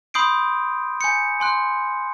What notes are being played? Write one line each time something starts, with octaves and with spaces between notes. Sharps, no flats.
B5 C6 D#6 G6 C7 D7
G#5 G6 C#7
G#5 C6 F#6